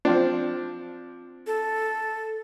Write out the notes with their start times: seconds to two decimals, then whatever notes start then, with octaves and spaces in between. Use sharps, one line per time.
0.05 F3 C4 D4
1.47 A4